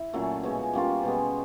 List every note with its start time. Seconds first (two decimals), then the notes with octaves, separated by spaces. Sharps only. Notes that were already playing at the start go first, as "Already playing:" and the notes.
Already playing: E4
0.13 A#2 F#3 A3 C#4
0.43 B2 G#3 C#4
0.73 G3 A#3 C#4 F4
1.03 B2 G#3 B3